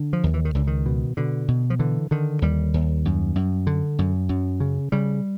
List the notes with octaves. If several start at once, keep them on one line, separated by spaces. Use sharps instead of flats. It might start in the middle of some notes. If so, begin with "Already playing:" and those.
Already playing: D3
F3
D#2
E3
D#3
C#2 D3
D#3
B2
B2 D3
B2
F3
D3 E3
D3 D#3
D#2 G3
D#2
F#2
F#2
D3
F#2
F#2
C#3
C#3 G3